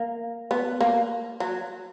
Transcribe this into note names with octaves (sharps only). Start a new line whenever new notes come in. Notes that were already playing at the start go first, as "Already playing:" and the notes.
Already playing: A#3
B3
A#3
F#3